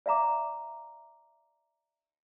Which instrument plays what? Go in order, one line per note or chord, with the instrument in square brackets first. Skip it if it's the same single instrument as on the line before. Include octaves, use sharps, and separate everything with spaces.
[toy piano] D5 E5 F5 A#5 D6